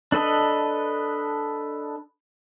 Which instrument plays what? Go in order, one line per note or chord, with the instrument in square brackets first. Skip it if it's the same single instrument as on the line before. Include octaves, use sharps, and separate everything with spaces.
[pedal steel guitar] D4 A4 B4 D#5